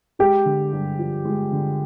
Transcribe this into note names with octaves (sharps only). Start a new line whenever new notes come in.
G#3 G4
D3
G2
F3
G#3
D3